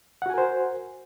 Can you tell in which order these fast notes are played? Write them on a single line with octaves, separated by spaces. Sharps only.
F#5 F#4 G#5 A#4 C5